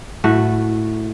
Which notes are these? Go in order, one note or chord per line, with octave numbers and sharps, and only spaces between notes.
A2 A3 F#4